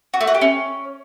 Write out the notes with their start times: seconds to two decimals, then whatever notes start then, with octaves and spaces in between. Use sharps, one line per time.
0.14 F#4
0.21 A3
0.28 F#4
0.34 G4
0.41 C#4